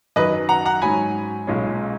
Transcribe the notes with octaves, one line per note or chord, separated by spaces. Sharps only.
F#2 D#3 F#3 B4 D#5
F#5 A#5
F#5 A#5
G#2 F#3 C#4 G#5 B5
B1 A#2 G#3 C#4